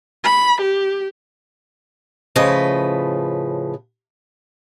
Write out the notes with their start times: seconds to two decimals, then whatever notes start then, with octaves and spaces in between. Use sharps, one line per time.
0.24 B5
0.61 G4
2.36 A2 C#3 F3 B4 D#5